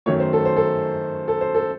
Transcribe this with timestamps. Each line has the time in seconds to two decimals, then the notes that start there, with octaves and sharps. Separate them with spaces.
0.06 F#2 D#3 F#3 A3 C#5
0.20 C5
0.33 A4
0.45 C5
0.56 A4
1.28 A4
1.41 C5
1.55 A4